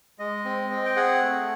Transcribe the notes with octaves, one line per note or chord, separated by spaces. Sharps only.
G#3 D#5
C4
C4
G5
G#4 F#5
A3